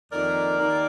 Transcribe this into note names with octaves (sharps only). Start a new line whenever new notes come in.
F2 D#3 A#3 A#4 D5
D#2 D#3 A#3